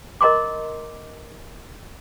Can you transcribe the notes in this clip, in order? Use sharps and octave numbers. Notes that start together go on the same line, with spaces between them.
A#4 D#5 A#5 C6 D6